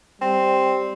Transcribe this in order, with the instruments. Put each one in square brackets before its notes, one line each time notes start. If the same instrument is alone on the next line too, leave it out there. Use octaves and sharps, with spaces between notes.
[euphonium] G3 [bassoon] C4